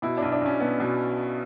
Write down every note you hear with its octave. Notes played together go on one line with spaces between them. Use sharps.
B2 E4
B1 D4
D4
B1 C#4
B2 B3
B2